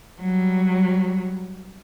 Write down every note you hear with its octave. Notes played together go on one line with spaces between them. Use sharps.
F#3 G3